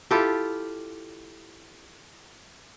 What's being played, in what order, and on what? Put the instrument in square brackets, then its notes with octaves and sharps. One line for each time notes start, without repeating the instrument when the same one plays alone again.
[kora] E4 F4 G4 A4